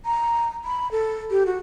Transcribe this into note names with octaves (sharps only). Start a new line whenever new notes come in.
A#5
B5
A4
G4
F#4